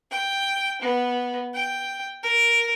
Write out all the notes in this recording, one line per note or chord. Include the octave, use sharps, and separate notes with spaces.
G5
B3
G5
A#4